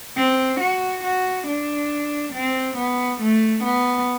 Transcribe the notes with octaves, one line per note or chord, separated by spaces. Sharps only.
C4
F#4
F#4
D4
C4
B3
A3
B3